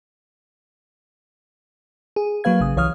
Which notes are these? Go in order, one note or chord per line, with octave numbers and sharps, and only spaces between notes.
G#4
F#3 A#3 B4 F5 G#6
A1 C#3 D#6
C2 E3 C#5 F5 D#6 F6